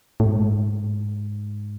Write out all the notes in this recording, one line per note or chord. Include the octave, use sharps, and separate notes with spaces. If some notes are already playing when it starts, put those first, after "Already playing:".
A2
G#2